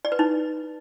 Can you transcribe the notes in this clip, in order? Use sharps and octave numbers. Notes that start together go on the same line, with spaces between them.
D5
B4
D#4